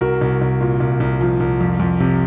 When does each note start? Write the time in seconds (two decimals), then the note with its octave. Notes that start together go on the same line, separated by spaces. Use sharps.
0.01 C2 F#4 A#4
0.21 C2
0.41 C2
0.61 A#2
0.80 C2
1.00 C2
1.21 F3
1.40 C2
1.60 F2
1.80 F2
2.00 C3